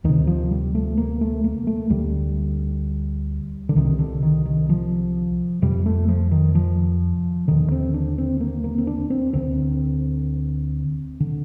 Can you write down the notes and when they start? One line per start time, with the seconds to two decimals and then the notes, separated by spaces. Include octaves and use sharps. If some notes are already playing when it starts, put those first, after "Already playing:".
0.04 D2 C3 D#3
0.27 F3
0.51 G3
0.75 A3
0.97 A#3
1.21 A3
1.44 A#3
1.67 A3
1.90 D2 D3 G3
3.69 D3
3.76 C2 C3 D#3
3.99 D3
4.23 D#3
4.46 D#3
4.69 F3
5.62 F2 C3 G3
5.86 A3
6.08 F3
6.31 D#3
6.55 F3
7.48 D#2 D3 D#3
7.72 C4
7.94 D4
8.18 C4
8.40 A#3
8.64 A#3
8.78 C4
8.87 D4
9.10 C4
9.33 D2 D3 C4
11.20 D3